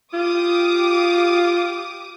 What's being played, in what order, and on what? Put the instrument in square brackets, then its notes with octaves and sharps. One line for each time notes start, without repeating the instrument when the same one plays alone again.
[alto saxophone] F4 [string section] G4 D6 D#6